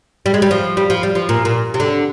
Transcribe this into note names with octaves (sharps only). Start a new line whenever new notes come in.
G3
G#3
G3
F3
G3
F3
G3
F3
A#2
A#2
C3
D3